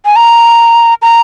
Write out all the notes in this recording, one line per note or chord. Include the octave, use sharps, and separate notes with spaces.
G#5
A#5
A#5